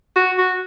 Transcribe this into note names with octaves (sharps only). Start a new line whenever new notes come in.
F#4
F#4